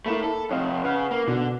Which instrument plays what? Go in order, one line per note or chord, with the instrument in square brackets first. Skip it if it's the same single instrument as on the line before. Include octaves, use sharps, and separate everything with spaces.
[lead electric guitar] A3 E4 [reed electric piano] A#3 B5
[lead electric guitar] A4
[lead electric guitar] F2 C3 [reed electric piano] C#5 D#5 F5
[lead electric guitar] C#3 [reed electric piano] B4 F#5 F6
[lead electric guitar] A#3
[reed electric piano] B2 [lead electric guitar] D3